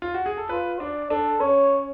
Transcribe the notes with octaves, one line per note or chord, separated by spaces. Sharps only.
F4
F#4
G#4
A4
F4 B4
D4 D5
D4 A4
C#4 C#5